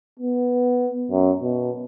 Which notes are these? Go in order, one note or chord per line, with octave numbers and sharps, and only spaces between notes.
B3
F#2
B2